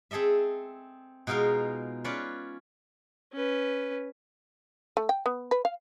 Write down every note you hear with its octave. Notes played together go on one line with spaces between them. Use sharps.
C4 G#4 A4 D#5 E5
B2 G#3 D#4 F4 A#4
C#4 F4 B4 C#5 D5
C#4 B4
A3
G5
B3
B4
F5